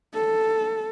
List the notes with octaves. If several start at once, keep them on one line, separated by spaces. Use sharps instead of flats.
A4